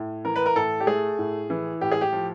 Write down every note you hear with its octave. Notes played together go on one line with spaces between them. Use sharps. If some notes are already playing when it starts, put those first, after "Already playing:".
Already playing: A2
E3 A#4
B4
A#4
A2 A4
G4
A3 G#4
A2
E3
A2 G4
G#4
G4
F3